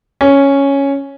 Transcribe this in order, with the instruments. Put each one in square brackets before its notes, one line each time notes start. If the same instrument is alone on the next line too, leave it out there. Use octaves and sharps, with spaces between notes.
[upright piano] C#4